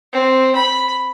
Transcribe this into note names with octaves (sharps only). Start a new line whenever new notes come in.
C4
B5